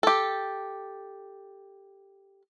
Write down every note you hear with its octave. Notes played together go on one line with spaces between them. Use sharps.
G4 A4